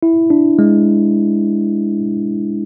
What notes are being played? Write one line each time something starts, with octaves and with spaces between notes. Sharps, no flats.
E4
D4
G#3